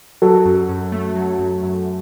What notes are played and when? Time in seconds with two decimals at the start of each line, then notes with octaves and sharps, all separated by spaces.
0.22 F#3 F#4 A4
0.45 F#2
0.69 F#2
0.92 A3
1.16 F#3
1.39 F#2
1.63 F#2